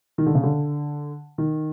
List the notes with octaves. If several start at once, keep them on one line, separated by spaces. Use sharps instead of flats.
D#3
D3
C#3
D3
D#3